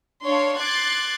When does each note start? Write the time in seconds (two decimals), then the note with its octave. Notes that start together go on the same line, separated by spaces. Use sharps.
0.25 D4 C#5 F5 C6
0.59 C6 D6 F#6 G#6 A6 C7